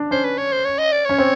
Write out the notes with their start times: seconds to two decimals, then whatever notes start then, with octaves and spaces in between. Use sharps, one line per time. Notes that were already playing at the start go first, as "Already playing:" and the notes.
Already playing: D4
0.11 C#4 C5
0.24 B4
0.38 C#5
0.52 C5
0.65 C#5
0.78 D#5
0.92 D5
1.05 C#4 C#5
1.18 C4